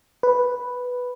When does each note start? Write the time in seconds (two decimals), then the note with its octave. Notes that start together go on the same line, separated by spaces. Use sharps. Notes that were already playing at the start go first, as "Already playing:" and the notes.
0.23 B4